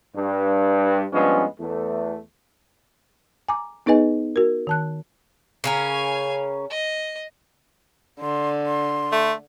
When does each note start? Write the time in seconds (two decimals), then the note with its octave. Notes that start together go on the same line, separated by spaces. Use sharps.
0.15 G2
1.12 G2 F3 G#3 B3 C#4
1.59 E2 A3
3.49 G#5 A#5 D6
3.86 B3 D#4 G#4 B4 D#5 G#5
4.36 F#4 A#4
4.67 D#3 A5 F#6
5.64 C#3 C#4 A#4 F5 G#5
6.70 D#5
8.20 D3 C6
8.67 C6
9.12 A3